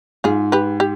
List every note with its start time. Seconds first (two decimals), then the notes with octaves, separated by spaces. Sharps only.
0.24 G#2 F4 G#4
0.52 G4 B4
0.80 G4